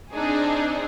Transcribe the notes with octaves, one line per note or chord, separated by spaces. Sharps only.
C4 D4 D#4 G#4